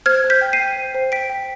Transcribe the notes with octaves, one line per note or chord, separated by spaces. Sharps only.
C5 F6 G#6
C5
G6 B6
G5
C7 D#7
G5
C5
C5
G5 B6 D7
G5